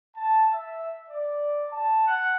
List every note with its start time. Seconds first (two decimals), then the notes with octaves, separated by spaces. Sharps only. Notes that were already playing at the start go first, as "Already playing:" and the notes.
0.16 A5
0.53 E5
1.09 D5
1.71 A5
2.06 F#5